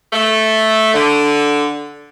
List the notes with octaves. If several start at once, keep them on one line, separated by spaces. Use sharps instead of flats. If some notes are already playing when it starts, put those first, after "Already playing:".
A3
D3